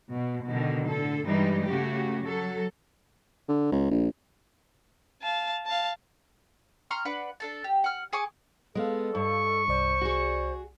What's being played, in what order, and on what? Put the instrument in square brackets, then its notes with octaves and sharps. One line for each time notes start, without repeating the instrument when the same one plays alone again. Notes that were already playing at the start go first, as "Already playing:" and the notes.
[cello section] B2
B2 D3 D#3
A2 D3 A4
G2 E3 G3 G#3 D#4
C#3 A3 F#4 G4
F#3 A4
[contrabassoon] D3
C#2
A#1
[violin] F5 A5
F5 A5
[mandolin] A#5 C6 C#6 F6
D4 B4 F#5
D4 A4 A5
G4
F#5 F6
G#4 G#5 C#6 D6
[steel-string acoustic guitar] G#3 B3 [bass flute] A4 [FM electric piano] D#5 F5
[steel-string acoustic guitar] G2 [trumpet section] C#6
[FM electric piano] C2 D5 [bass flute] C5
[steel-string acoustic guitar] F#4 G#4